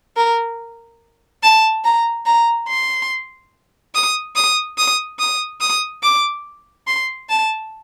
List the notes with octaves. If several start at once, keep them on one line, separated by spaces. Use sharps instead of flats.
A#4
A5
A#5
A#5
C6
D#6
D#6
D#6
D#6
D#6
D6
C6
A5